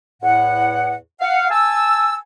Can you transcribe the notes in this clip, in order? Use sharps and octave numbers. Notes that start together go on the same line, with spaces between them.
E2 A2 F#5
F5 F#5
G#5 A5 E6